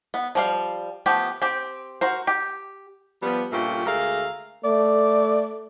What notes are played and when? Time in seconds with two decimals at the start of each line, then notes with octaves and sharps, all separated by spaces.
0.14 B3
0.35 F3 G3 F5
1.06 F3 A3 B3 G4
1.42 C4 G4
2.01 F#4 A#4 C5
2.27 G4
3.22 F3 G3 B3
3.52 G2 A#2 A3 C#4 F4 G4
3.86 D2 G#3 A3 A#4 F5
4.64 A3 D5